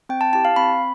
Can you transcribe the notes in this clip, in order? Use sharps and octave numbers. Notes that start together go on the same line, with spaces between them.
C4 G5
A5
E4 G4 A5
F5
C4 B5